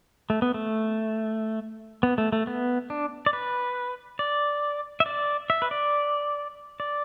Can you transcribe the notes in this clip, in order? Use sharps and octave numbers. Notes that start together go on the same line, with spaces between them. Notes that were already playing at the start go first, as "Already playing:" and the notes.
A3
B3
A3
B3
A3
A3
B3
D4
D5
B4
D5
E5
D5
E5
B4
D5
D5